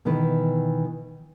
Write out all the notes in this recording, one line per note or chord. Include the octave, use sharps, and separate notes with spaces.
B2 D#3 E3 B4